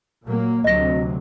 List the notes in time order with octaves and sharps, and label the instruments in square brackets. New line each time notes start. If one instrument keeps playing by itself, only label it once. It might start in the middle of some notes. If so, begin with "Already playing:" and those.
[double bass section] A#2 F#3 A#3
[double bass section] D2 C3 F#3 [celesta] D#5 A#6